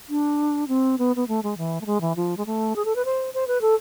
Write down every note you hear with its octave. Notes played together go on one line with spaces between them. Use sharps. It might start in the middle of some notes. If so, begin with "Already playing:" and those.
D4
C4
B3
B3
A3
G#3
E3
A3
G#3
E3
F3
G#3
A3
G#4
A4
B4
C5
C5
B4
A4